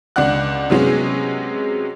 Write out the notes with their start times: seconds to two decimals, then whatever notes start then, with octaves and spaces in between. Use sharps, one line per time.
0.16 C#2 D4 D5 F#5 F#6
0.70 C3 F#3 G#3 B3 C#4